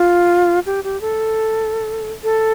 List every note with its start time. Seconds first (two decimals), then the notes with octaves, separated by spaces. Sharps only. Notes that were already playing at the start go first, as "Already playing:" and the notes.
Already playing: F4
0.66 G4
0.84 G4
1.01 A4
2.23 A4